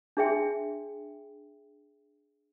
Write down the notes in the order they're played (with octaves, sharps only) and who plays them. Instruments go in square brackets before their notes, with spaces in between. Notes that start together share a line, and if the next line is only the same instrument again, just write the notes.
[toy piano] D4 G#4 E5 G5 C6